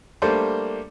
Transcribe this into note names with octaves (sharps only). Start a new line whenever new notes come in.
G3 A3 A#3 D4 A4 C5